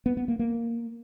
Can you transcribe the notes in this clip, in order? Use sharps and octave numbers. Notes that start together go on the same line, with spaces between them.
B3
B3
A#3
A#3